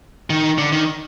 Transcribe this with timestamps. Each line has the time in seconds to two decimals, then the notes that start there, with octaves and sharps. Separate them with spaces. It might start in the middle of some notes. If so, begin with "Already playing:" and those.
0.30 D#3
0.58 D3
0.72 D#3